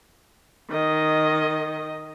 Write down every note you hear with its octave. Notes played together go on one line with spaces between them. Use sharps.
D#3 D#5